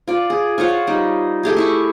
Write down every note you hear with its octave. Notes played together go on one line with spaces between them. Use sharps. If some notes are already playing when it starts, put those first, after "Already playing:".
F4 D5
G#4
F4 C5 C#5 F#5
G3 D#4
A3 G4 G#4
E4 E5 C#6